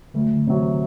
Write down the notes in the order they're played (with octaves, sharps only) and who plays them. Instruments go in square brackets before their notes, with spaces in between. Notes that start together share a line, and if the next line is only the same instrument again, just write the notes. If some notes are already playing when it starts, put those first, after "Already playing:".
[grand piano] D2 [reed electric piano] D3 F#3
[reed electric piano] D3
[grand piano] C3 F#3
[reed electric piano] E3